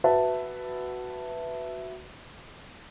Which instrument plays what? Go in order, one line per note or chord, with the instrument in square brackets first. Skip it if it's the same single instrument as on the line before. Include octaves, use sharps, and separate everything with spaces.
[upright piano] F#4 B4 E5 A5